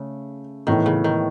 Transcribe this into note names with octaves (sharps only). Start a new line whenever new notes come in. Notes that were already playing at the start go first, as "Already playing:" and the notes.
Already playing: C#3 A3
A2 D#3 E3 B3
C#3
D#3